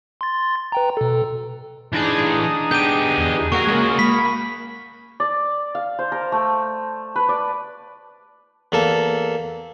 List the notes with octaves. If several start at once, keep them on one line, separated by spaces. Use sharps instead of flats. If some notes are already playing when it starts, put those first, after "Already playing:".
C6 A6
B4 G5 A#5
B2 A4
E3 D4 D#4 G#4 A5
B3 G4 G6 D#7
E2
F#3 A#3 F#4 G#4 A#4 C#6
G#3 C#4
B5 B6
D5
F5
C5
A#4
A3
B4
D5
E2 A#3 A4